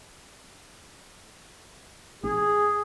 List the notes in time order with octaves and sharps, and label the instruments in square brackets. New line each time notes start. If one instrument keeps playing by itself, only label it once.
[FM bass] A1 [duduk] G#4